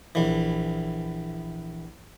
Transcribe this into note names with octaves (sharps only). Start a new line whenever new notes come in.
A#1 E3